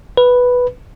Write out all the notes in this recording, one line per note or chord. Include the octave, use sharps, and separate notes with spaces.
B4